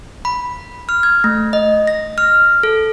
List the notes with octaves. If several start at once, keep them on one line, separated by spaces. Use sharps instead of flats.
B5
F6
G#6
A3
D#5
A#6
F6
A4